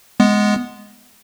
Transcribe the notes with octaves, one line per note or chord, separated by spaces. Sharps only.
G#3 B3